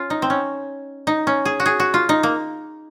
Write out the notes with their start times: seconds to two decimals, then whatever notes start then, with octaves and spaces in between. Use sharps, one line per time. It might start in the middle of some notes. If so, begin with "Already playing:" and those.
Already playing: C#4 F4
0.10 D#4
0.22 C4
0.30 C#4
1.07 D#4
1.27 C#4
1.45 G#4
1.60 F#4
1.66 G#4
1.80 F#4
1.94 F4
2.09 D#4
2.23 A#3